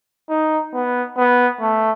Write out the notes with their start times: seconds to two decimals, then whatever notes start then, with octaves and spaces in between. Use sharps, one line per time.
0.30 D#4
0.73 B3
1.17 B3
1.61 A3